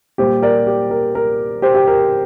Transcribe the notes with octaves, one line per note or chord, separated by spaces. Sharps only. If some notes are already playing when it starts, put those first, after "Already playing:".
A#2 G3 G4 C5
A#4 D5
G4
A#4
A#4
G4 C5
G4
A#4